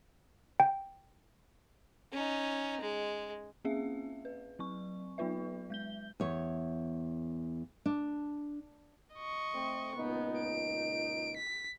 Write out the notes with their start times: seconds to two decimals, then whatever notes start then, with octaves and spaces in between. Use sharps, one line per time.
0.60 G5
2.12 C#4 D#4
2.81 G#3
3.65 A#3 C4 C#4 G#4 E5 F5
4.25 B4
4.59 F#3 C4 C#6
5.18 F#3 B3 D#4 F4 B4 E5
5.70 G#3 G6 G7
6.20 E2 C#5
7.86 D4
9.16 D#5 C#6
9.54 A3 C4
9.96 C#2 A#2 B3 D#4
10.40 D7
11.37 B6